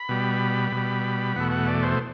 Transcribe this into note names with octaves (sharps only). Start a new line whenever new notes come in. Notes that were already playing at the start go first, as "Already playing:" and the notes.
Already playing: B5
B2 G3
B2 G3
E2 B2 A3 F#5
F#5
D5
C5